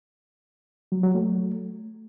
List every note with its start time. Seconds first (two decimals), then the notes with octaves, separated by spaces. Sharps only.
0.92 F#3
1.03 F#3
1.15 A3